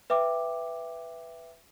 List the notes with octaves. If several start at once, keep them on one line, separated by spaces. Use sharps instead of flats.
B4 E5 G5 D6